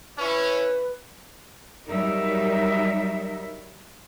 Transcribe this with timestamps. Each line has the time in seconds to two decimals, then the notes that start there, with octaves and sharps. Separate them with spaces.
0.19 C#4 E4 B4 C#5
1.88 F#3 G3 D#4 A#4 E5